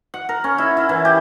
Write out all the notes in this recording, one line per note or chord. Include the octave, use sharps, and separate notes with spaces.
F#5
A#4
C#4
E4
E4
E3
G4